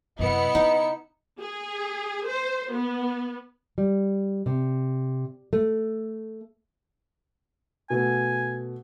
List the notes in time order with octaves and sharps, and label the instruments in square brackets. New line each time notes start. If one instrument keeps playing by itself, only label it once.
[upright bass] F#2 C3 [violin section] B3 E4 C#7 [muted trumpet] D#5
[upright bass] C#3 [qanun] D#4
[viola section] G#4
C5
B3
[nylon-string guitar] G3
C3
A3
[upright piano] B2 A3 B3 [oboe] G#5